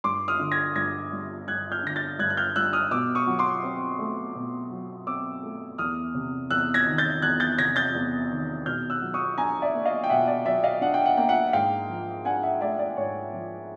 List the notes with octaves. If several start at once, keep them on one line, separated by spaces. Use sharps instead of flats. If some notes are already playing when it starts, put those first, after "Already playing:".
G2 C6 D6
D#6 F6
D3
G#6 A#6
G2 G#6 A#6
G3
G2 F#6 G#6
F6 G6
D3 A#6
G6 A6
G2 F#6 G#6
F#6
F6 G6
G3 E6 F#6
D#6 F6
B2 D6 E6
C#6 D#6
F#3
C6 D6
C4
A3
B2
F#3
C4 D6 E6
A3
E2 D#6 F6
C3
E2 E6 F#6
G#6 A#6
D#3
G6 A6
E2 F#6 G#6
G6 A6
C3 G#6 A#6
G6 A6
E2
D#3
B2 F6 G6
E6 F#6
F#3
C#6 D#6
D4 G#5 A#5
D5 E5
A#3
D#5 F5
G5
B2 E5 F#5
D5
F#3 D5 E5
D#5 F5
D4 F#5
G5
F#5
A#3 G5
E5 F#5
G#2 F5 G5
F3
D4 F#5 G#5
E5 F#5
A3 D5 E5
D5
G#2 C#5
F3